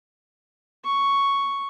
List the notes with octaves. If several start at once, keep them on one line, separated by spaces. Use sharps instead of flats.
C#6